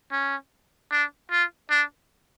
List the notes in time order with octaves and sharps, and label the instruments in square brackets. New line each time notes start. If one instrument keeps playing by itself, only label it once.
[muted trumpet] C#4
D4
F4
D4